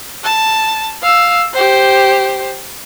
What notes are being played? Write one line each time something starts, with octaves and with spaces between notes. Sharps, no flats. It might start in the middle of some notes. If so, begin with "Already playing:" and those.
A5
F5 E6
G4 C5